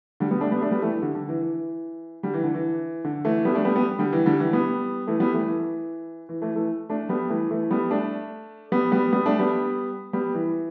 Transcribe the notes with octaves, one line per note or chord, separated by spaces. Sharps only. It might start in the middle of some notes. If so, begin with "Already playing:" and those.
D3 G3
G3 B3
A3 D4
G3 B3
A3 D4
G3 B3
E3 A3
E3
D3 G3
D3
E3
E3
D3 G3
E3
D3
E3
D3
E3 A3
G3 B3
A3 D4
G3 B3
G3 B3
D3 G3
E3
D3 G3
E3
G3 B3
E3 A3
G3 B3
E3 A3
E3
E3
E3 A3
E3 A3
A3 D4
G3 B3
E3 A3
E3 A3
G3 B3
A3 D4
G3 B3
G3 B3
G3 B3
A3 D4
G3 B3
G3 B3
E3